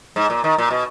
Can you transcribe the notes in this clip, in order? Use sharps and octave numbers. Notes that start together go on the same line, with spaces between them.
G#2
A#2
D#3
A#2
B2